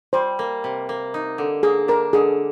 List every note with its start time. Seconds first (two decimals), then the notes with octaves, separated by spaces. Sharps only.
0.13 G3 C5
0.39 A#3
0.64 C3
0.89 A#3
1.14 D#4
1.38 D3
1.63 A#3 G#4
1.88 D4 A#4
2.13 D3 G#4